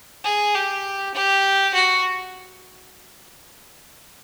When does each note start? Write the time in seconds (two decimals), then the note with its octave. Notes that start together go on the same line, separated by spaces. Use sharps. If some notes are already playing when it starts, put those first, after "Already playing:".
0.24 G#4
0.55 G4
1.15 G4
1.74 F#4